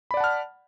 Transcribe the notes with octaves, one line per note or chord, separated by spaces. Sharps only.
D5 F#5 A5 B5 F6